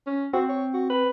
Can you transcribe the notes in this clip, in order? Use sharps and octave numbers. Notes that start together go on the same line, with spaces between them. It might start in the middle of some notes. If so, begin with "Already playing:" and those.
C#4
C4 F#4
C#5
F#4
B4